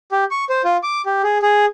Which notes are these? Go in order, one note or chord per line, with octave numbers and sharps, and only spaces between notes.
G4
C#6
C5
F4
D6
G4
G#4
G#4